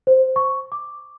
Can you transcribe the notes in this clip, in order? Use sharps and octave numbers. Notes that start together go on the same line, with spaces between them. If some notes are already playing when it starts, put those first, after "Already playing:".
C5
C#6
D6